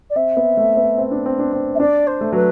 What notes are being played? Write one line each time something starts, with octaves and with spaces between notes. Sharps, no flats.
D5
C4 E5
B3
A3
B3
C4
D4
C4
D4
C4
E5
D4 D5
C5
A3
F#3 B4